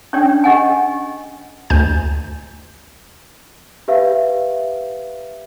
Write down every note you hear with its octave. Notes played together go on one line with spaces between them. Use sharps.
C#4 D4 C#5 D5 G5
G4 D#5 F#5 G#5
D2 G#5 G6
G4 B4 E5 F5